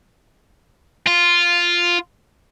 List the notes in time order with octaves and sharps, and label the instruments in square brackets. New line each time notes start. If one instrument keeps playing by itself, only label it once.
[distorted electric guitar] F4